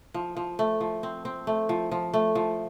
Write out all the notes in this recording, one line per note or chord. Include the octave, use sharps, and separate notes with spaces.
F3
F3
A3
F3
C4
C4
A3
F3
F3
A3
F3